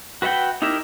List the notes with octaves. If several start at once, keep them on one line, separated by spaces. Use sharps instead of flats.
F#4 B4 E5 F#5 G5
D#4 E4 G4 A#4 E5